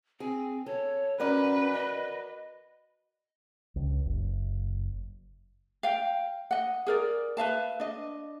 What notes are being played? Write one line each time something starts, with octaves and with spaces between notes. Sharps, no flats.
C4 G#4
A4 C#5
C#4 F#4 A#4 B4 D5
D#5
C#2
F#1
F5 G5
D#5 F#5
G#4 A#4 D5
B4 E5 F5 A5
D4 D#5